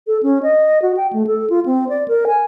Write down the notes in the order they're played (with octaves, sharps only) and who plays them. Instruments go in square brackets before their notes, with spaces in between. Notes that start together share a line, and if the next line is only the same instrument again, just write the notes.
[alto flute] A4
C#4
D#5
F#4
G5
A3
A4
F4
C4
D5
A#4
G#5